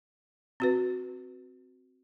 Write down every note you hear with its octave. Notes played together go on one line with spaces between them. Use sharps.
C4 F#4 B4